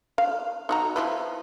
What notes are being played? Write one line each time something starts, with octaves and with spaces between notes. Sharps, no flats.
F5
D#4 F#4 A#5
F3 E4 B4